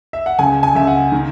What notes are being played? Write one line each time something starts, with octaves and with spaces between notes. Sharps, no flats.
E5
F#5
C#2 G#5
G#5
C#2 E5
F#5
D#3